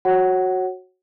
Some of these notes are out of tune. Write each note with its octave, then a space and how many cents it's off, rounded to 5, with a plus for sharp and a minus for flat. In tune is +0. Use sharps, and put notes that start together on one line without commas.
F#4 +0 C#5 -25 F#5 +15